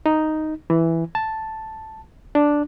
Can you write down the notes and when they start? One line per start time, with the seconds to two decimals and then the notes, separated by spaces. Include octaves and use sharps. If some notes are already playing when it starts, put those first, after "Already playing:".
0.06 D#4
0.70 E3
1.15 A5
2.35 D4